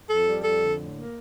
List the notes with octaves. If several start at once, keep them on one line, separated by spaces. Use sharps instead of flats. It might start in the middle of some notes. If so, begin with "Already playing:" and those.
F2 A4
G3
F2 A4
D3
A2
A#3